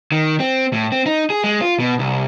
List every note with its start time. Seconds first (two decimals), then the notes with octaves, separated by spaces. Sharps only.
0.12 D#3
0.40 C4
0.73 A2
0.92 C4
1.06 D#4
1.30 G#4
1.44 G#3
1.62 F4
1.80 B2
1.99 C2